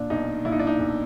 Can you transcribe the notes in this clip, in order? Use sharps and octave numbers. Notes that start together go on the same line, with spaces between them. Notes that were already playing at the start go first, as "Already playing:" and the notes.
Already playing: A#2 D4
B1 D#4
A#2 E4
D#4
D4
D#4
B1